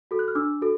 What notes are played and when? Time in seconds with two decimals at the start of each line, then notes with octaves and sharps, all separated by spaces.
0.11 F#4 A4
0.19 F#6
0.28 F6
0.35 D4 D6 E6
0.61 F#4 A4